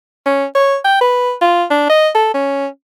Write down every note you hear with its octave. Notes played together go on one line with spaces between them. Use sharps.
C#4
C#5
G5
B4
F4
D4
D#5
A4
C#4